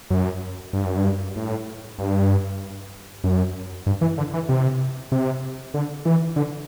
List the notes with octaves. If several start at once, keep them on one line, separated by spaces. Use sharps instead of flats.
F#2
G2
F#2
G2
A2
G2
F#2
G2
E3
D3
E3
C3
C3
D3
E3
D3